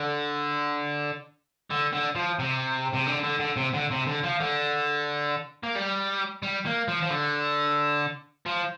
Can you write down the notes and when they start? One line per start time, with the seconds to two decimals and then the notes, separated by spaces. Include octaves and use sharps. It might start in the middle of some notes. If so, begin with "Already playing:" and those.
Already playing: D3
1.71 D3
1.93 D3
2.15 F3
2.39 C3
2.93 C3
3.07 D3
3.23 D3
3.39 D3
3.56 C3
3.74 D3
3.91 C3
4.07 D3
4.24 F3
4.40 D3
5.64 A#3
5.76 G3
6.43 G3
6.66 A#3
6.88 F3
7.03 F3
7.10 D3
8.46 F3